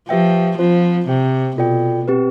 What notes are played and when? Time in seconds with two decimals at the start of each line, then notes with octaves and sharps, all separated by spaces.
0.09 F3 G4 B4 E5 G5
0.59 F3 C4 F4 C5
1.08 C3 G4 C5 G5
1.57 B2 F4 A4 D5 G5
2.08 C4 G4 B4